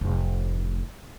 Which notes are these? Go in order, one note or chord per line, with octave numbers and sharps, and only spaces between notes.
F1 A2